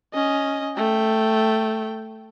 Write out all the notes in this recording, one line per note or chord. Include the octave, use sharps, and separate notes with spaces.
C#4 D#5
A3 G5